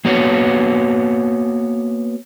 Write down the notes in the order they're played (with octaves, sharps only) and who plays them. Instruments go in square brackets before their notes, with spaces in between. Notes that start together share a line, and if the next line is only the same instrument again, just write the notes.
[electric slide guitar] A#3 B3 F#4 C#5